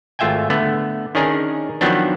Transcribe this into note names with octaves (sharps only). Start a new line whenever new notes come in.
G#1 A3 F4 E5 G5 G#5
D3 A3 B3
D#3 C#4 D4 G#4 A#4
D#3 F3 F#3 B3 C4 D4